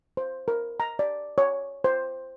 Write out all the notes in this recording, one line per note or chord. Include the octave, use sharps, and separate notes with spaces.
C5
A#4
A#5
D5
C#5
C5